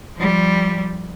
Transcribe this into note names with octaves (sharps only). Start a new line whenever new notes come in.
F3 G3